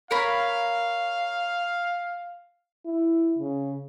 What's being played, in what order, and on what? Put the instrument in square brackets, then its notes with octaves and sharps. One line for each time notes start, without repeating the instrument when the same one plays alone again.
[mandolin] A#4 C#5 B5 [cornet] F5
[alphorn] E4
C#3